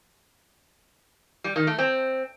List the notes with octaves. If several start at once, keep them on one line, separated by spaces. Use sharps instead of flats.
G3
D#3
A3
C4